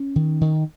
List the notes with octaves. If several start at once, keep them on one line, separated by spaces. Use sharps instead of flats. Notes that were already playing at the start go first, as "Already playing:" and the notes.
Already playing: C#4
D#3
D#3